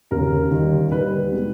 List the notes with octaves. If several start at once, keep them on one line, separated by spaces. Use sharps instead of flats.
E1 D#2 C#3 A#4
D#2 D#3 G3
D#2 D#3 G3 B4
B2 G#3